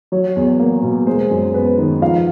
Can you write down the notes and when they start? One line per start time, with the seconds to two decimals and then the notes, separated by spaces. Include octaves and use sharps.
0.12 F#3 C#5
0.36 E2
0.60 A#3
0.83 B2
1.07 G#3 C5
1.31 F#2
1.54 B3 B4
1.78 D#3
2.01 F3 F5